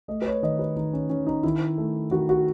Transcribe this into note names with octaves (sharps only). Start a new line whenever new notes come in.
A3 D#5
B4
C#5
D#3 D#5
B4
D#3 D#4
C#4
D#3 C#4
D#4
D#3 E4
A3
D#3 F#4
F#4